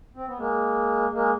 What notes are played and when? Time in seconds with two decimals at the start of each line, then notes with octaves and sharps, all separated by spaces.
0.15 C4
0.27 B3
0.37 G#3 A#3
1.13 G#3 A#3